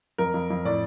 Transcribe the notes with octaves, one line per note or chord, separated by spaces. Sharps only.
F2 A#4
F2
F2
A2 D5